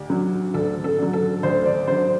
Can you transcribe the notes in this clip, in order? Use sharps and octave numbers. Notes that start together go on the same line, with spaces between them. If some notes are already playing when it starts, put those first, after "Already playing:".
Already playing: D2 G4
D3 F#3
D2 A4
A4
D3 F#3
A4
D2 C5
D5
D3 F#3 C5